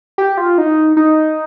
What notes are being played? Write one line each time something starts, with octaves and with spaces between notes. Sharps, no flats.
G4
F4
D#4
D#4